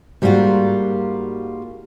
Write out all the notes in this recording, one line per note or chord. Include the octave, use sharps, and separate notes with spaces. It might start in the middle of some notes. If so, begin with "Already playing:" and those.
G#2 G3 A#3 B3 F4 F#4